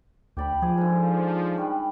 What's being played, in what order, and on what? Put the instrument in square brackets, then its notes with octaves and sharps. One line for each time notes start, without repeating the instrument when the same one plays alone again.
[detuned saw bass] D2 [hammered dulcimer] G4 D5 B5
[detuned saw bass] F3 [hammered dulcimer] G#4 D6
[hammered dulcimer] G#2 D3
D#3 G3 B4